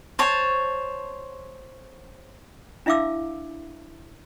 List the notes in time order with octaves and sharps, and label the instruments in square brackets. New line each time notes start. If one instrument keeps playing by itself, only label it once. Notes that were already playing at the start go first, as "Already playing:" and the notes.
[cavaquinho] C5 C#5 A5
[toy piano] D4 E4 E5 F5 D6 E6